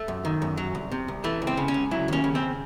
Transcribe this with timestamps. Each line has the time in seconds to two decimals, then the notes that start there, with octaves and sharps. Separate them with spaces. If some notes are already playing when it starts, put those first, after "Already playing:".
Already playing: A3
0.08 F#2
0.25 D#3
0.42 F#2
0.57 F#3
0.75 C2
0.92 C3
1.08 C2
1.24 E3 A3
1.42 C#2
1.47 C4
1.57 C#3
1.68 C#4
1.74 C#2
1.91 F#3 E4
2.08 D#2 C#4
2.24 C#3
2.35 C4